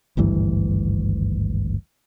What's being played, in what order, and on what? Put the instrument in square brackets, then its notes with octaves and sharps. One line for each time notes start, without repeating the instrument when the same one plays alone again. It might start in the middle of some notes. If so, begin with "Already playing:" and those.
[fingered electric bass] G#1 D2 G2 E3